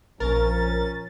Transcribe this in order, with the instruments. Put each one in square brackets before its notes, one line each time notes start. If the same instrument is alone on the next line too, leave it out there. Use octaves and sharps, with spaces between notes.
[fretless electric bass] A#1 [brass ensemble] F3 C#4 [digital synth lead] A#4 [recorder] A6